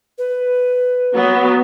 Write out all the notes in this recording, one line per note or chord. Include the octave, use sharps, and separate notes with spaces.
B4
F#3 B3